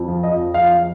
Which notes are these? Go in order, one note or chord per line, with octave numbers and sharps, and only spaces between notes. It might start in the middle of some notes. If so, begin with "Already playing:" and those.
Already playing: F2
F3
D#5
F2
F3 F5
F3